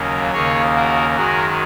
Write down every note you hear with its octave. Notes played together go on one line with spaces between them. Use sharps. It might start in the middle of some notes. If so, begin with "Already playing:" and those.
Already playing: D#2 C#3 F#3 A#3
D#2 C#3 A#3 G#4 C#5
F#4 A#4
F#2 D#3 G#3 F#4 A#4